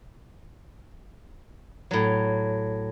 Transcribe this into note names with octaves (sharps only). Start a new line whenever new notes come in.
A2 F#3